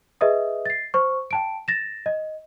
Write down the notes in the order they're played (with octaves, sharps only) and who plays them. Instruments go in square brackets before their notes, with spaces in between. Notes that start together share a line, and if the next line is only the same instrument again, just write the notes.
[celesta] G#4 B4 D#5 E5 D#6
A6 C7
C5 C#6
G5 A5 D7
A6 A#6 E7
D#5